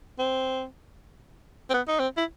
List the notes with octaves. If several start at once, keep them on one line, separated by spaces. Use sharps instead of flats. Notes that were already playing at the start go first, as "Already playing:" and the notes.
C4
C4
B3
D#4
C4
E4